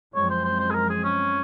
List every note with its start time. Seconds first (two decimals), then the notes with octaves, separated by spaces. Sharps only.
0.15 F#2 F3 G#3 C4 C#5
0.30 C5
0.45 C5
0.60 C5
0.71 G#4
0.75 A#4
0.90 G#4
1.04 C#4